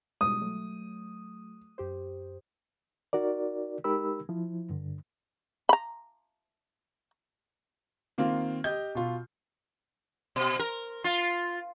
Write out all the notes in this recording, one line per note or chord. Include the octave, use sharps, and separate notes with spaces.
B2 G3 G#3 D#6
F#3 A3
F#2 G4 C5
D#4 F#4 A#4 D5
G#3 D#4 G4 A#4 B5 E6
F3 E4
G2 D3
A#5 B5
D#3 A#3 C4 F4
G4 D#5 G6
B2 F4
B2
A#4
F4